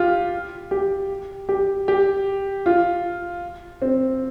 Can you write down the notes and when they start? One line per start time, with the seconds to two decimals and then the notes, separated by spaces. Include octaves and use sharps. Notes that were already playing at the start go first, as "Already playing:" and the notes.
Already playing: F4 G4
0.71 G4
1.49 G4
1.88 G4
2.66 F4
3.82 C4